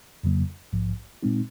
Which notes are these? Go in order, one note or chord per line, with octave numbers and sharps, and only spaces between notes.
F2 C#3 F#3 A#3
A#1 G#2 F3
A#2 G#3 C4 D#4